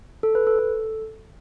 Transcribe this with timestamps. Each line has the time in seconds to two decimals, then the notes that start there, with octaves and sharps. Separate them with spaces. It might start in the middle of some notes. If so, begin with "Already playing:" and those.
0.23 A4
0.35 B4
0.47 A4
0.59 A4